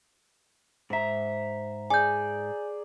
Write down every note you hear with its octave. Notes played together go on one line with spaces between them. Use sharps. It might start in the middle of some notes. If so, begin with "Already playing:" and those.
G#2 C5 E5 A#5
G#4 D5 G#5 G6